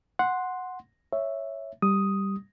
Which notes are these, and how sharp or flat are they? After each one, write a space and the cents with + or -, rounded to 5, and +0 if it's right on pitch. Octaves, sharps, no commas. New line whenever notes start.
F#5 -10 C6 +0
C#5 +0 E5 +0
G3 +0 D#6 +5